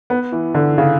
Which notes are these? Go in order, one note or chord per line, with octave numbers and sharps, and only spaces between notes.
B3
E3
D3
C#3